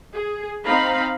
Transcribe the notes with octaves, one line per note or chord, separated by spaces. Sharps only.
G#4
C4 D#4 F5 A#5 B5